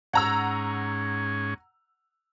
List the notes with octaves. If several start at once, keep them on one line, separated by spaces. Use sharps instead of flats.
G#2 C#4 F#5 A#5 E6